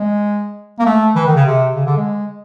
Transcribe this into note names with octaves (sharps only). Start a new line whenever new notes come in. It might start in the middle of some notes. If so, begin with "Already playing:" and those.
Already playing: G#3
A#3
A3
E3
D#3
C#3
C3
C#3
D3
G#3